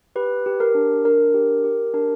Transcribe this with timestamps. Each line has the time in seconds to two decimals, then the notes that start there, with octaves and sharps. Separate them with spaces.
0.16 G4 B4
0.46 G4
0.60 A#4
0.75 D4
1.05 D4 A#4
1.34 G4
1.64 G4
1.94 D4 A#4